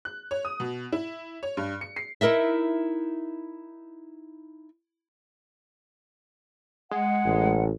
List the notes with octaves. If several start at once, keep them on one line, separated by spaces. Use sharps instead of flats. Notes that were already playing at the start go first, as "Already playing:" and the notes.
F#6
C#5
D#6
B2
E4
C#5
G2
C#7
C7
D#4 E4 A#4 D#5 E5
G#3 F#5
A1